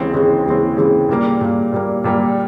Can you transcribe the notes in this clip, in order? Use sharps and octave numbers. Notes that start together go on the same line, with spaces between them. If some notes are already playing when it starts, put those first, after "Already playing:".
Already playing: D#2 C#3 E3 G#3 C4
D#2 C#3 E3 G#3 C4
D#2 C#3 E3 G#3 C4
D#2 C#3 E3 G#3 C4
A#2 G3 A#3
A#2 G3 A#3
A#2 G3 A#3
A#2 G3 A#3